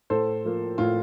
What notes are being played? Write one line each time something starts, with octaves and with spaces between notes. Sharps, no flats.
A2 A4 C5
F3 A#3
A2 F4